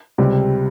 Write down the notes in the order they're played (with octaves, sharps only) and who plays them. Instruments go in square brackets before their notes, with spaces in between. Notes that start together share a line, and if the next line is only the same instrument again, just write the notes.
[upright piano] C#2 C3 G3